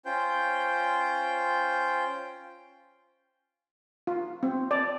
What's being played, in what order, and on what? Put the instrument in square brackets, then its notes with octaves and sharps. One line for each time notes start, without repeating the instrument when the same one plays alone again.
[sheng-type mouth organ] C#4 F4 C5 G5 G6
[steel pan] F4
C4
D5